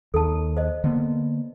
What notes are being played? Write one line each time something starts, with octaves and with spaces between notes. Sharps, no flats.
D#2 A4 A5
C5 D#5
D3 A#3 B3